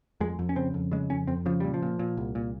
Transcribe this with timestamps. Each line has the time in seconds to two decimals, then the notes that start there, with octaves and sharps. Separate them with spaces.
0.20 F2 G#3
0.39 F2
0.49 C#4
0.56 C#3 C4
0.74 F2
0.91 C#3 G#3
1.10 F2 C#4
1.27 F2 C4
1.46 C#3 F3
1.60 A#2 G3
1.74 F3
1.82 A#2
1.99 A#2
2.17 C2
2.35 A#2